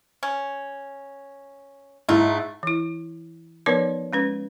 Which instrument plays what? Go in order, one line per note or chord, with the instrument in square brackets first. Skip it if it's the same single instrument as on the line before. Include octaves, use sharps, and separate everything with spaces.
[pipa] C#4
[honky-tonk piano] G#2 E4 [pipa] A3 F4
[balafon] E3 E4
F3 B3 D#4 A#4 B4 C#5
G#3 C#4 B4